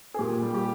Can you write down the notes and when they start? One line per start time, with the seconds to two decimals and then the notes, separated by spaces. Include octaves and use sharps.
0.14 G#4
0.19 A#2 G4
0.42 G3
0.54 G4